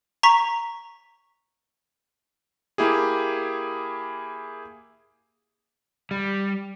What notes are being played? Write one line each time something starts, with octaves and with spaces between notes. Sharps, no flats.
A#5 C#6 B6
A#3 E4 G4 G#4
G3